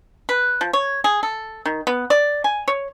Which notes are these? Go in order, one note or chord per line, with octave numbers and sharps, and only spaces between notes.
B4
F3
C#5
G#4
A4
D#3
B3
D5
G#5
C#5